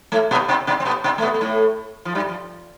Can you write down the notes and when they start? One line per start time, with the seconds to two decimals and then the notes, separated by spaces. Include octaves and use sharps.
0.12 A2 A3
0.31 B2 B3
0.48 C3 C4
0.67 C3 C4
0.80 C4
0.85 B2 B3
1.04 C3 C4
1.18 A3
1.22 B2 B3
1.34 B3
1.41 A2 A3
2.05 F3
2.15 G2 G3
2.29 F3